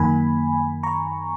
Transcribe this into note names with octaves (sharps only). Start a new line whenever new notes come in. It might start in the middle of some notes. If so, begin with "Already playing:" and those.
Already playing: F#2 D#3 A#3 G#5 B5
A#5 C#6